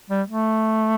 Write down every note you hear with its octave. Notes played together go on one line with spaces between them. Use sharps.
G3
A3